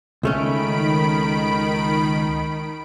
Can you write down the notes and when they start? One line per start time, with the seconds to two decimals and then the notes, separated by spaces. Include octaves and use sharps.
0.23 C#2 D#3 A3 C#4 B5 D7